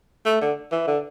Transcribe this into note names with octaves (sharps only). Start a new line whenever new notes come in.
A3
D3
E3
D3